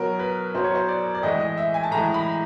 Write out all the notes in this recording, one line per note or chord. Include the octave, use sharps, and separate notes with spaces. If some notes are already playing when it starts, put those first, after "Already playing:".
Already playing: B2 F#3 A#4
B4
B2 F#3 C5
C#5
C5
D5
D5
A2 E3 G#3 D#5
D#5
E5
G#5
A5
A2 E3 G#3 A#5
B5